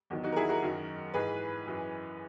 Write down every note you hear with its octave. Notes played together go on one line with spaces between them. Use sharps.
E2 D#3 F#3
D#4 F#4
A#4
E4 G#4
F#4 A#4
F#2 D#3 F#3
G#2 E3 G#4 B4
F#2 E3